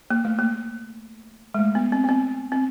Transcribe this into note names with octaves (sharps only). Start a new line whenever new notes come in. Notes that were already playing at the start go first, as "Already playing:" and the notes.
A#3
A3
A#3
G#3
A3
B3
C4
B3
C4
C4